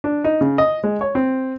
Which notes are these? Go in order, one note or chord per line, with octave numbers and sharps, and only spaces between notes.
D4
D#4
C#3
D#5
G#3
C#5
C4